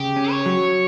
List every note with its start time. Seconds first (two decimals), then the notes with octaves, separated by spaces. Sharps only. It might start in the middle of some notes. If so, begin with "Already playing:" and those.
Already playing: C#3 G4
0.16 C#4
0.31 C#5
0.46 F#3